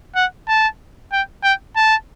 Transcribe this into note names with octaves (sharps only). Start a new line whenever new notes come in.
F#5
A5
G5
G5
A5